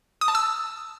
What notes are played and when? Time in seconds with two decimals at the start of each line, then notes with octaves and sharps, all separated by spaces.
0.21 D#6
0.28 A5
0.35 E6